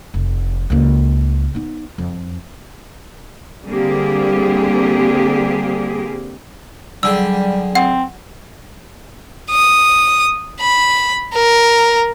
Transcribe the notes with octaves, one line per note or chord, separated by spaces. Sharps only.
F1
C#2 A#3
B3 D#4
F2
D3 G3 A#3 C4 G4 G#4
D3 F#3 G3 G#4 G5 E6
C4 F#5
D#6
B5
A#4